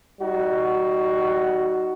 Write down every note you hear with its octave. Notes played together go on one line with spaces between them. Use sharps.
G3 D#4 F#4